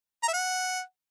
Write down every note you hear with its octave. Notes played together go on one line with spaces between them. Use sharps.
A#5
E5
F#5